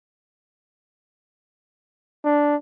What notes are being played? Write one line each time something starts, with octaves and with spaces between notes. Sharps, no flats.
D4